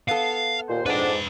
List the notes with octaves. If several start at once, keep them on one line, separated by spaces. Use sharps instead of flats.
B3 A4 F5
D#2 A#2 C5
F2 G#2 B3 D4 B4 G5